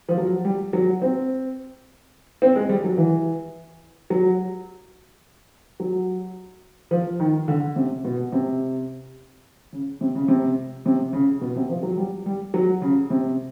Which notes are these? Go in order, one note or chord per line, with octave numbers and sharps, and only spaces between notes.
F3
F#3
G3
F#3
C4
C4
G#3
G3
F#3
E3
F#3
F#3
F3
D#3
D3
C3
B2
C3
C#3
C3
C#3
C3
C3
C#3
B2
C3
F3
F#3
G3
G3
F#3
C#3
C3